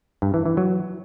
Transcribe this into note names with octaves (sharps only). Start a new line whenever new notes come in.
G2
E3
E3
F#3